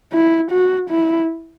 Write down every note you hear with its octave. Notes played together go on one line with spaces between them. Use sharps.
E4
F#4
E4